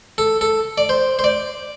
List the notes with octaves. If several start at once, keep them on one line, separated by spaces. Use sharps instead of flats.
A4
A4
D5
C5
C5
D5